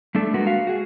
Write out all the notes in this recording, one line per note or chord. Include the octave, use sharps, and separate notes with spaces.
G3 A3 D4 A4
G#3 A#3 F#4 B4
F#4 F5
F#4 G#4